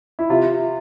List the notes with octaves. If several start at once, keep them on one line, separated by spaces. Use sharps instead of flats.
E4
C3 F4